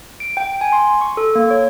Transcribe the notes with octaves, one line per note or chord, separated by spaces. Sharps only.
D7
G5
G#5
C6
C#6
A4
A#3
C#5